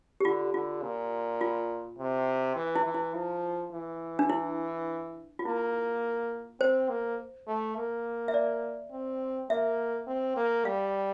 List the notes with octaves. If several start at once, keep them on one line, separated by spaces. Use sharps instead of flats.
G4
D3 F4
D3 F4
A#2
F4
C3
E3
E4
E3
E4
F3 E4
E3
D4
E4
F4
A#3 E4
C4 C5
A#3
A3
A#3
E5
D5
C4
A#3 E5
C4
A#3
G3 F5